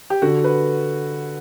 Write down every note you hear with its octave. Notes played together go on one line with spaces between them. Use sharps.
G4
D3 F#4
B4